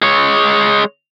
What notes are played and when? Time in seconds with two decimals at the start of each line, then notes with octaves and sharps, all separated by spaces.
0.02 G#3 C#5